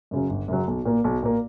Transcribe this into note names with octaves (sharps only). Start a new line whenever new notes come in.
F#2 C#3 F#3
G1
F#2 C#3 F#3
B1
A#2 A#3
B1
A#2 A#3